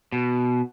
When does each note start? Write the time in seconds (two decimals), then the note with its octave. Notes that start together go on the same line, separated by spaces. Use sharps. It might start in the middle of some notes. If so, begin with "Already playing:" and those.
0.12 B2